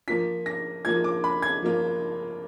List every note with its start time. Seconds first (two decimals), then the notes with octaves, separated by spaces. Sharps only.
0.08 F3 A#3 F4 B6
0.46 A#6
0.85 F3 A#3 F4 G#6
1.04 D6
1.24 B5
1.42 G#6
1.62 F3 A#3 F4